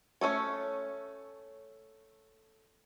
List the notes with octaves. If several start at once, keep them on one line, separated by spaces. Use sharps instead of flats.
A3 C#4 A4 C#5